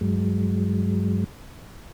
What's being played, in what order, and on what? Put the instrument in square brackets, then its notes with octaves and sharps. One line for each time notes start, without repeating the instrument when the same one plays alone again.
[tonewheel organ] G2 F#3 G#3